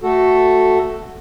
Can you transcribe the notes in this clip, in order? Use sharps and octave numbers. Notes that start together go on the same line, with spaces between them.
A3 F#4 A4